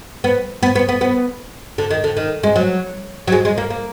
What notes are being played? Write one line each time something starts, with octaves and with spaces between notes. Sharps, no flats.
B3
B3
B3
B3
B3
D3
D#3
D3
D#3
G#3
F#3
F#3
G#3
G#3
A#3
A#3